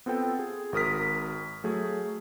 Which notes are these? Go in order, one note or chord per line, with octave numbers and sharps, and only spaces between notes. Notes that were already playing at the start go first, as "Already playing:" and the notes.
B3 C4 F4 A4 G5
G#4
G#1 F#4 A#4 D#6 F6 B6
F#3 A3 G#4